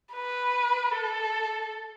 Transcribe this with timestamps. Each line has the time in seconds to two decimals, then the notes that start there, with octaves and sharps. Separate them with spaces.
0.13 B4
0.91 A4